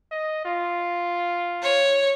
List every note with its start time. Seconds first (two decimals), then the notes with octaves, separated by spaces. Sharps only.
0.11 D#5
0.45 F4
1.63 C#5